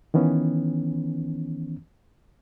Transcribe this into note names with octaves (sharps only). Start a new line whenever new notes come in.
D#3 E3 B3 C#4